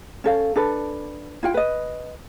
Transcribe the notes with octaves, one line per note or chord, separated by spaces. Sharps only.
C#4 A4 F5
D4 A4 B4
E4 F4 G5
B4 D#5